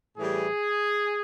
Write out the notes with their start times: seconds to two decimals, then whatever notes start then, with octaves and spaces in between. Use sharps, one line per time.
0.17 A2 E3 G3 G#4